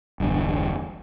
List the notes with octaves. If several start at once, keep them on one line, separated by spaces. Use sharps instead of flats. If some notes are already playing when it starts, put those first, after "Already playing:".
E1 B1 G2 D3